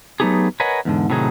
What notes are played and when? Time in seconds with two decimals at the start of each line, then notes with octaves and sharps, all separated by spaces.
0.20 F#3 A3 B3 D#4 G4 G#4
0.60 A#4 B4 C#5 D#5 F#5 G#5
0.85 E2 G#2 D3
1.10 A2 C3 D#3 F#3 D#4 G#4